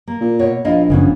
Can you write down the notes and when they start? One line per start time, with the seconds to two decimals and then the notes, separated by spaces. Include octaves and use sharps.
0.08 A#3
0.21 A#2
0.39 B2 C#5
0.65 A#1 E4 F4 D#5
0.90 F#1 C#3 E3 B3 C#4